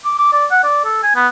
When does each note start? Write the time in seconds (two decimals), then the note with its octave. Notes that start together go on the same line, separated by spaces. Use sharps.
0.05 D6
0.18 D6
0.33 D5
0.51 F#5
0.64 D5
0.85 A4
1.03 G#5
1.15 B3